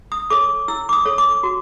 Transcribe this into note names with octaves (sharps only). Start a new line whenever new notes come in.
D#6
A4 C#5 D6
E4 E6
D6
D#6
A4 C#5
D6
F#4